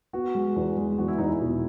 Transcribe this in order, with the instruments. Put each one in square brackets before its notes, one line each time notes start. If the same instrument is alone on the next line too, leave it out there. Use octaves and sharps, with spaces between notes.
[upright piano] B3 [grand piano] F#4
[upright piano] G#3
E2
G#3
[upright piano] E2 [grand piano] F#4
[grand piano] E4
[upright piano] E2 [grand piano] D#4
[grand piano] E4
[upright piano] B2